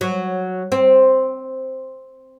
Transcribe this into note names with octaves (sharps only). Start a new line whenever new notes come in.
F#3
C4